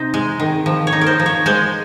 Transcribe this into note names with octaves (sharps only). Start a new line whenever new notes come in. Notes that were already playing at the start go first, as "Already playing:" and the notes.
Already playing: C3 D#4 C5
G#3
D#3
F3
C#5
D#4
A#4
C5
F3
C#5
G#3 C5